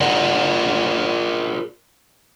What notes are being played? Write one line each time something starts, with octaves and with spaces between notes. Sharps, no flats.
F4 G#4 A#4 D5 D#5 F#5